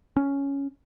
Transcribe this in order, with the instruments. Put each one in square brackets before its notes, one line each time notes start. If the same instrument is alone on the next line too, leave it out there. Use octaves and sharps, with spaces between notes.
[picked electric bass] C#4